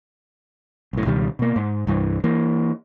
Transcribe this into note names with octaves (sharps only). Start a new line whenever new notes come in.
B1 A2
C#2 B2 D#3 G3
B2 A#3
G#2
C2 G2 E3
E3 A#3